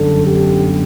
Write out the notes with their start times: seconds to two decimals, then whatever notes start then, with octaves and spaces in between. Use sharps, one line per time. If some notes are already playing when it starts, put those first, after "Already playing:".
Already playing: G1 F#2 D3 A4
0.25 G4